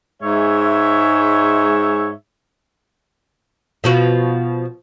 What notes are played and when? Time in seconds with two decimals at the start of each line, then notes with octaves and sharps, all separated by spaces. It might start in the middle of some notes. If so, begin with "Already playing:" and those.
0.22 G#2 G#3 C#5 E5
3.84 B2 F3 F#4